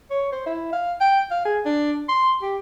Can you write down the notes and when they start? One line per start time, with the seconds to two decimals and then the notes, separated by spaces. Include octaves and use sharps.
0.11 C#5
0.32 C5
0.47 E4
0.73 F5
1.01 G5
1.31 F5
1.45 G#4
1.65 D4
2.09 C6
2.42 G4